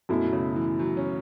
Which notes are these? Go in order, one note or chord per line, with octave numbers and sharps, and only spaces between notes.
F#2 B2 F#3 A3 E4
B2
C#3
E3
F#3
C#4